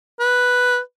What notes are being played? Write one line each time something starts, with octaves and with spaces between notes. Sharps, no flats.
B4